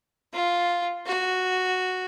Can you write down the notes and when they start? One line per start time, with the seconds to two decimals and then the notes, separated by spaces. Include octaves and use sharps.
0.33 F4
1.06 F#4